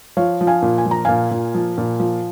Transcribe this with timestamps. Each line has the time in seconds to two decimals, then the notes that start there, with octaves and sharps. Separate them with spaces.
0.17 F3 C#5 F5
0.41 F3
0.47 F5 G#5
0.62 A#2
0.78 G#5
0.86 F3
0.91 A#5
1.05 A#2 F5 G#5
1.31 A#2
1.55 F3
1.78 A#2
2.00 F3